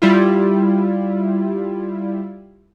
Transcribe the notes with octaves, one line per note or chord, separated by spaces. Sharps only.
G3 E4 F4